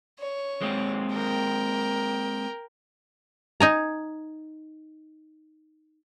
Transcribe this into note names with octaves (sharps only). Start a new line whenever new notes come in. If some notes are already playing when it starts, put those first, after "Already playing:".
C#5
G#3 A#3 C4
A#4 G5
D#4 G#5 A#5